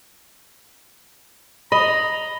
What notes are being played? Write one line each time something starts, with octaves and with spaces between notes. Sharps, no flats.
D#5 A#5 B5